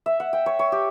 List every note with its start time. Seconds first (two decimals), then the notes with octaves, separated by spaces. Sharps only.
0.06 E5
0.20 F#5
0.33 G5
0.46 C#5
0.59 C#5
0.72 G4